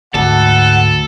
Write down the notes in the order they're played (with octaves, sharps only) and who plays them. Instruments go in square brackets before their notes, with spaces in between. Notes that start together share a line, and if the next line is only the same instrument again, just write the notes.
[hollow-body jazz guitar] D2 [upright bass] G#2 [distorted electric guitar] A4 [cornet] F#5